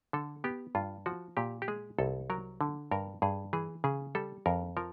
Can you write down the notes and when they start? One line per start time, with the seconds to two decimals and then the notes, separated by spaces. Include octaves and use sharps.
0.13 D3 A4
0.44 B3 G4
0.75 G2 F4
1.06 F3 F#4
1.37 A#2 G4
1.62 G4
1.68 G#3 G#4
1.99 C2 A4
2.30 F#3 A#4
2.61 D3
2.91 G2 A#4
3.22 G2 G#4
3.53 E3 G#4
3.84 C#3 G#4
4.15 G3 A4
4.46 F2 A#4
4.77 F3 A#4